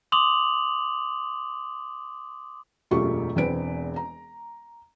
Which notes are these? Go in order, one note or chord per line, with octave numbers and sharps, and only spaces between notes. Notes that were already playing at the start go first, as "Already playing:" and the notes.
C6 D6 D#6 F7 F#7
E1 F#2 A3 F4 G4 C#6
E1 E2 C4 B4 D7
A#5